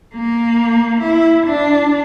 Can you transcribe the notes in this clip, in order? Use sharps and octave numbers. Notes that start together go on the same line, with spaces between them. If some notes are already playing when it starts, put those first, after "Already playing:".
A#3
E4
D4